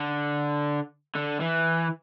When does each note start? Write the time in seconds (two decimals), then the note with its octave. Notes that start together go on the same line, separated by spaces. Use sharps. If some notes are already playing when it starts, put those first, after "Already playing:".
Already playing: D3
1.15 D3
1.41 E3